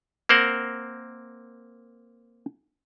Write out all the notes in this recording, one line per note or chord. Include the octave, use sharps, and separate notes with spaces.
A#3 C4 A#4 C5 F#5